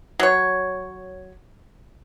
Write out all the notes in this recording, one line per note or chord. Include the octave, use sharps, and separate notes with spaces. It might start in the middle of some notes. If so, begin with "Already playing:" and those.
F#3 C#5